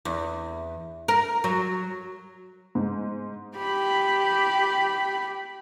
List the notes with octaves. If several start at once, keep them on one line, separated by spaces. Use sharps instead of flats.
E2
A#4
F#3
G#2
G4 B5